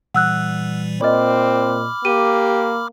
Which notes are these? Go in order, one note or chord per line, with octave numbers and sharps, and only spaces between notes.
A#2 E3 G3 F#5 E6 F#6
A#2 C4 D5 D#5 B5 D6 F6
A#3 G4 D#7